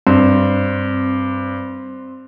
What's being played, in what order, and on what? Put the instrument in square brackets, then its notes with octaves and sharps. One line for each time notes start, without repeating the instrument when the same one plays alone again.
[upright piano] G2 [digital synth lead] C4